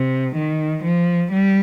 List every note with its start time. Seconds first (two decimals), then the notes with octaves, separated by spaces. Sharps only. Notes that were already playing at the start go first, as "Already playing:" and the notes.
Already playing: C3
0.35 D#3
0.83 F3
1.32 G3